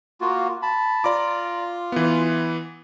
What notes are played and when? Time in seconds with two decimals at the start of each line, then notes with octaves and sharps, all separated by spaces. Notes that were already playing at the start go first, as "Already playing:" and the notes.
0.21 A#3 F4 F#4
0.63 A5 B5
1.04 F4 D5 A#5 D6
1.92 E3 B3